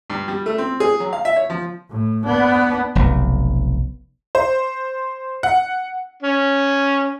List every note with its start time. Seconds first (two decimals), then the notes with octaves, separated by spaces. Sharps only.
0.10 G2
0.28 G3
0.46 A3
0.58 C4
0.80 G#4
1.00 F#3
1.13 F5
1.25 E5
1.36 C#5
1.50 F3
1.90 A2
2.25 B3 D4
2.95 F1 B1
4.35 C5
5.43 F#5
6.23 C#4